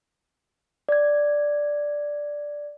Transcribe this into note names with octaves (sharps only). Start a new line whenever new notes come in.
D5 G#6